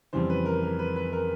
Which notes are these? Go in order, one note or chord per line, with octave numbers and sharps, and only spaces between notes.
F2 C#3 E3 G3 C5
B4
A#4
A#4
B4
B4
A#4